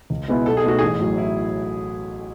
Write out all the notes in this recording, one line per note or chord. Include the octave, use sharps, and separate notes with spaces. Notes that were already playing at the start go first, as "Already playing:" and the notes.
C#2
B2 G#3 B3 E4
B1 A4
G#4
B2 A3 D#4 F#4
A1 G#4
A2 F#3
E4